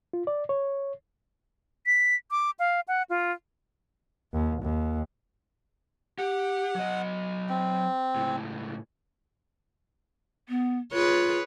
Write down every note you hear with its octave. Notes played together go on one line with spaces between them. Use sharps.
F4
D5
C#5
B6
D6
F5
F#5
F4
D#2
D#2
G4 F#5
F#3 D#5
C4
C#2 A2
B3
F4 G#4 B4 C#5